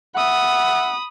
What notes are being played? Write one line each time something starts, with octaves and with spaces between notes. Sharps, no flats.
E5 F#5 B5 D#6